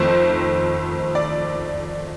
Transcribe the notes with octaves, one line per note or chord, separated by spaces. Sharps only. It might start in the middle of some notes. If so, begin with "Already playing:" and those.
Already playing: F2 D#3 A3 C5
D5